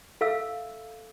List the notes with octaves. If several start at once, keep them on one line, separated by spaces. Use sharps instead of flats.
A4 E5 F5 E6